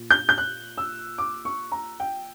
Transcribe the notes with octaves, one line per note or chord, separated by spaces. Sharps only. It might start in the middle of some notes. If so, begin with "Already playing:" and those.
Already playing: A#2
G6
G6
F#6
E6
D6
C#6
A#5
G5